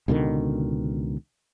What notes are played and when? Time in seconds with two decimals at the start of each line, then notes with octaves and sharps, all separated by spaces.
0.08 C#2 B2 D3 D#3